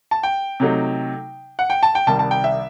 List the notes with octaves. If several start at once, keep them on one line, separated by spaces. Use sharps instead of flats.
A5
G5
C3 F#3 A3 D#4
F#5
G5
A5
G5
C2 C3 D#3 G3 A5
A5
G5
E5